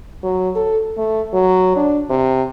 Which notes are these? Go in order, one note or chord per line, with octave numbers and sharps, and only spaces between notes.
F#3
A4
A3
F#3
D4
C3